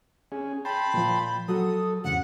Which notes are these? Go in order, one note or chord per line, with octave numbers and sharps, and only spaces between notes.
C#4 G#4
G5 A5 B5 C6
A#2 F3
F#3 F#4 A4 D#6
E2 G#2 C#3 F#5